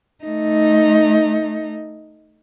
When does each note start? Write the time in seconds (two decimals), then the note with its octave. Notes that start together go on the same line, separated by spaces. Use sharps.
0.24 A3 D#4